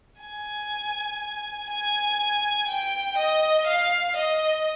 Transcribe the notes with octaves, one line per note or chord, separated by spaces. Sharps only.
G#5
G#5
G5
D#5
F5
D#5